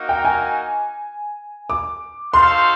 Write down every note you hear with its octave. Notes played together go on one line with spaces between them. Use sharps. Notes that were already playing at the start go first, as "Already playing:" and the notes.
Already playing: A#3 D#4 F#4 A#4
G5
G#5
D6
D#4 F#4 A4 C5 F5 C6